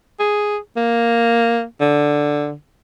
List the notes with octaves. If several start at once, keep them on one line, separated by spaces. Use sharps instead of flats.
G#4
A#3
D3